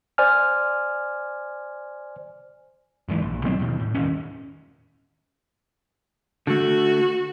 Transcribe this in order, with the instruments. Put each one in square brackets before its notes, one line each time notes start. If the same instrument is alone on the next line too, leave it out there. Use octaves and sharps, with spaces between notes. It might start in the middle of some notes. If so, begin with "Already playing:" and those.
[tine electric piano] C5 D5 G#5 F6
[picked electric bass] E1 G#2 E3
A#1
B2 F#3 B3 C4
D#2 B2
A2
E1 D#2 C#4
[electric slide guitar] D3 A3 [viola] F#4